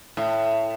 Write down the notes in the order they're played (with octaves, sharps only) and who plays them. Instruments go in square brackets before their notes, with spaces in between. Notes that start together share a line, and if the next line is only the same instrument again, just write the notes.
[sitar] A2